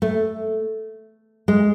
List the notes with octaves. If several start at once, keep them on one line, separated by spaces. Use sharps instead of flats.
A3
G#3